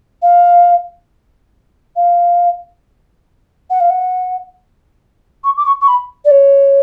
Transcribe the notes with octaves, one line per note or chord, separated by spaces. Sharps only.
F5
F5
F#5
F5
F#5
C#6
D6
C#6
C#6
B5
D5
C#5